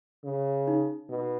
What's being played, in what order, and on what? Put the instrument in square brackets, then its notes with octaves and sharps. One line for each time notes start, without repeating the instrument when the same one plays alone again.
[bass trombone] C#3
[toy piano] D#4
[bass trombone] B2